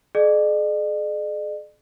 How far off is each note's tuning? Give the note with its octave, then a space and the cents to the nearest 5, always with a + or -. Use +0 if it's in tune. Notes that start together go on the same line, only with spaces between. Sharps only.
G#4 +40 D5 +45